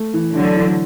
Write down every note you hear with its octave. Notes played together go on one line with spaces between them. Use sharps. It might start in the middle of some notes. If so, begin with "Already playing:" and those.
Already playing: A3
E3
D3 F#3 D4
E3